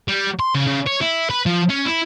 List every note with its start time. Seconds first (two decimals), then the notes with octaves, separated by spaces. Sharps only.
0.08 G3
0.40 C6
0.54 C#3
0.67 C#3
0.86 C#5
1.01 E4
1.30 B4
1.46 F3
1.69 C#4
1.85 E4